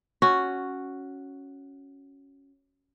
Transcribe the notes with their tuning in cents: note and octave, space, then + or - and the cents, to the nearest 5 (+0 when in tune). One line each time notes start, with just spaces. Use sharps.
C#4 +0 F#4 +0